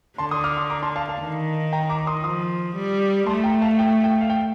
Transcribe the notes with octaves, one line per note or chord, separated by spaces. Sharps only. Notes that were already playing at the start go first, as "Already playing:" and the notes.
D3 A5 C6
C6 D#6
D6 F6
C6 D#6
A#5 D6
A5 C6
F5 A5
F5 A5
D#3
G5 A#5
A#5 D6
C6 D#6
F3 C6 D#6
G3
A3 A5 C6
G5 A#5
F5 A5
G5
G5
F5
G5